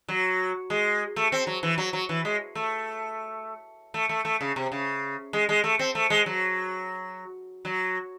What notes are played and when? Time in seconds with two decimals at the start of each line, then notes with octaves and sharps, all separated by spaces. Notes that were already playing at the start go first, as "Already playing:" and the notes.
0.08 F#3
0.70 G#3
1.16 A3
1.32 C4
1.47 F#3
1.63 E3
1.78 F#3
1.93 F#3
2.09 E3
2.25 G#3
2.55 A3
3.94 A3
4.09 A3
4.25 A3
4.41 C#3
4.56 C3
4.72 C#3
5.33 G#3
5.49 G#3
5.64 A3
5.79 C4
5.95 A3
6.10 G#3
6.26 F#3
7.65 F#3